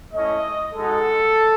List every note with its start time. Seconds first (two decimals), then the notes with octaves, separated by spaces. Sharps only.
0.14 A3 C#4 E4 D#5
0.73 G#3 D#4 F#4 A4